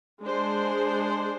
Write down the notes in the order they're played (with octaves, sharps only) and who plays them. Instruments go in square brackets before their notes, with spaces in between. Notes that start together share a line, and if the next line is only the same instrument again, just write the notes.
[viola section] G#3 D4 G#4 C5